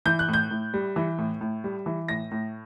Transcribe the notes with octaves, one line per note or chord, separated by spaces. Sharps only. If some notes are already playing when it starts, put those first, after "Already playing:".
E3 G6
F#6
A2
G6
A2
G3
E3
A2
A2
G3
E3
A2 A#6
A2